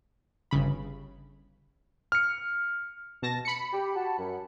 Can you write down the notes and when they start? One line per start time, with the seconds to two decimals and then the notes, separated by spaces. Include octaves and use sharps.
0.51 G1 C#3 B5
2.12 F6 C#7
3.22 B2 A5 A#6
3.45 B5 C#7
3.72 G4
3.95 F#4 A5
4.19 F#2